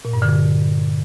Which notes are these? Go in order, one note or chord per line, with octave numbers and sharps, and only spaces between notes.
A#2
G2
D3